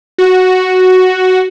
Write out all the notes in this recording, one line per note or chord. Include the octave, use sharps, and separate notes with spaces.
F#4